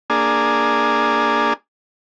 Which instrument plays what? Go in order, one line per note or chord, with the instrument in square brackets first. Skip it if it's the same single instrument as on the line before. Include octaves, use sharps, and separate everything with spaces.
[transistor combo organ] A#3 D4 G#4